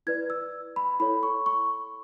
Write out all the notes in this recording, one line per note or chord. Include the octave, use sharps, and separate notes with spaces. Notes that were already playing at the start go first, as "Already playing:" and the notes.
E4 B4 D5 G#6
E6
B5
E4 A4 C#5 B5
C#6
C#6